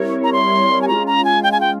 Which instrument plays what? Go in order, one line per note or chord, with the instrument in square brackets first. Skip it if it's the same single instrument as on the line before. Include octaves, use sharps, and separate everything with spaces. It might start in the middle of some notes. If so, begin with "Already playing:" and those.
Already playing: [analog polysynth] G3 C4 E4 A#4 C#5
[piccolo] A#5
C6
G#5
[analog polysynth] G#3 C#4 F4 [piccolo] A#5
[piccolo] A#5
G#5
G5
G#5
G5